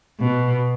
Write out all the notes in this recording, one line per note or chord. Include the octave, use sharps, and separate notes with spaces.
B2